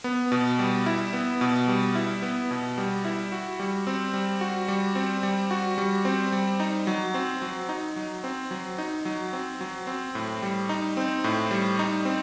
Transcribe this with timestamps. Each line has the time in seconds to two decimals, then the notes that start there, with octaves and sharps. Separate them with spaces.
0.04 B3
0.32 B2
0.59 G3
0.86 E4
1.13 B3
1.41 B2
1.68 G3
1.95 E4
2.22 B3
2.51 B2
2.78 G3
3.05 E4
3.32 F#4
3.59 G3
3.87 C4
4.14 G3
4.41 F#4
4.68 G3
4.95 C4
5.23 G3
5.51 F#4
5.78 G3
6.05 C4
6.32 G3
6.60 D#4
6.87 F#3
7.14 C4
7.42 F#3
7.69 D#4
7.96 F#3
8.24 C4
8.51 F#3
8.78 D#4
9.05 F#3
9.33 C4
9.61 F#3
9.87 C4
10.15 A2
10.42 G3
10.69 D#4
10.97 C4
11.24 A2
11.51 G3
11.79 D#4
12.05 C4